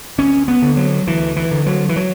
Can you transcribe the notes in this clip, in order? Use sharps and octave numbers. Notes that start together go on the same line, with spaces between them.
D2 C#4
B3
D3
F#3
D2 E3
E3
D3
F#3
E3
F#3